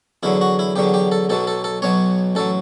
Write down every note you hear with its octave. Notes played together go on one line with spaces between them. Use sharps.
E2 D3 F#3 E4
F#4
E4
E2 D3 F#3 G4
G4
A4
B1 B2 F#3 A4
A4
A4
B1 B2 F#3 C#5
A1 F#3 A4